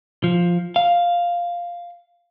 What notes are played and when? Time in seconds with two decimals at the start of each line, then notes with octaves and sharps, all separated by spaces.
0.24 F3
0.76 F5